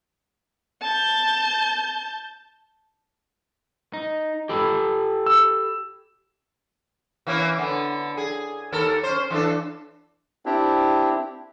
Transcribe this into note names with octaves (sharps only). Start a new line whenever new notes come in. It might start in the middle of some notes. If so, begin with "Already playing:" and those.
A5 G6
D#4
G4 A4 B5
E6
E3 A#3 C#4
D3 B3
G#4
D#2 A4 A#4
C#4 C5
E3 D4 A4
C4 D4 E4 G4